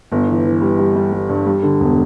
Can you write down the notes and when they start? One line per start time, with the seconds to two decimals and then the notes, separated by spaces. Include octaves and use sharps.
0.12 G1
0.27 E3
0.45 E3
0.61 G3
0.79 G3
0.96 G3
1.12 G3
1.29 G2
1.46 G3
1.63 D3
1.80 E1